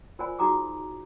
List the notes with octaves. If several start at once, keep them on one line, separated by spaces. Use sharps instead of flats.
F4 A#4 C5 D5 G#5 B5
D#4 F#4 G#4 A#5 D6 D#6